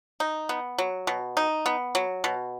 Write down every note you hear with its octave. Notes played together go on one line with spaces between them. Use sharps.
D#4
B3
F#3
B2
D#4
B3
F#3
B2